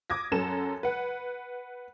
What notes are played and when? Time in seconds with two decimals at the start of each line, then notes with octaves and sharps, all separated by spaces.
0.10 D6 D#6 G#6 A#6
0.32 F#2 F#3 A4 A#5 E7
0.83 B4 F#5